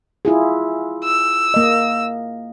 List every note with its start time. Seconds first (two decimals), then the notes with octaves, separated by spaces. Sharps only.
0.25 E4 F4 G#4
1.04 E6
1.54 A#3 D#5